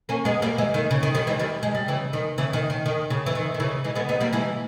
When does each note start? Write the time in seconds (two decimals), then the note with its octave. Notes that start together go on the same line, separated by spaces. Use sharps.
0.09 A#3 C#4
0.25 G#3 B3
0.42 G3 A#3
0.58 E3 G#3
0.74 D#3
0.91 C#3
1.03 D#3
1.15 D#3 G3
1.27 E3 G#3
1.39 D#3 G3
1.63 G#3
1.75 G3
1.88 C#3 E3
2.13 D#3
2.38 C#3 E3
2.53 D#3
2.70 D#3
2.86 D#3
3.10 C#3
3.26 E3
3.35 D#3
3.54 D#3
3.60 C#3 E3
3.84 E3 G#3
3.95 G#3 B3
4.09 B3 D#4
4.20 G3 A#3
4.33 E3 G#3